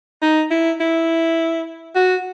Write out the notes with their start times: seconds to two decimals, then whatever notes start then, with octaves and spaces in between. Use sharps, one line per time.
0.22 D#4
0.51 E4
0.80 E4
1.95 F#4